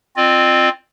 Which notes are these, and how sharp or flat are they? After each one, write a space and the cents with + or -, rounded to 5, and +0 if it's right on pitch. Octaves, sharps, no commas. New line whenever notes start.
C4 +0 F4 +0 D#5 -45